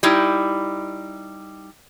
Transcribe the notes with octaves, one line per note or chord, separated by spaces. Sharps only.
G3 D#4 E4